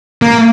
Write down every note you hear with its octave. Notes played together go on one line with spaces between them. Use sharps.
A#3